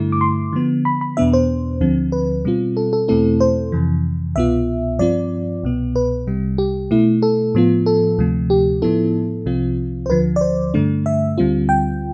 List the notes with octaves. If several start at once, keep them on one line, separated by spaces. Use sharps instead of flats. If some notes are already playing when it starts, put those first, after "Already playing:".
Already playing: G2 D3 A3 E4
D6
C6
D3 F3 B3
B5
B5
E2 B2 B3 D4 E5
C5
D2 D3 F3 C4
B4
B2 G3 C4 F4
A4
A4
E2 B2 A3 C4 E4 A4
C5
F2 C3 E3
C2 B2 B3 F4 E5
G2 F3 C4 F4 D5
C2 B2 B3
B4
C2 C3 G3
G4
B2 A3 E4
A4
A2 F3 B3 F4
A4
D2 C3 F3 A3
G4
A2 F3 B3 E4 A4
C2 C3 F3 C4 F4
C5
D2 D3 F3 B4
D5
C5
G2 D3 A3 D4
E5
D2 D3 G3 C4 F4
G5